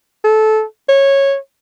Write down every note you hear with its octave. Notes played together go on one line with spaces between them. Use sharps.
A4
C#5